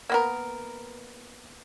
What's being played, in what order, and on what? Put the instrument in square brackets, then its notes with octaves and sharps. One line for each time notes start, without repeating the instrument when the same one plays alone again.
[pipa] A#3 B3 A#4